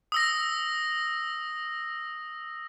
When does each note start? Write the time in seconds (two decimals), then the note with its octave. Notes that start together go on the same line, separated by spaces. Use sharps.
0.12 D#6 E6 A#6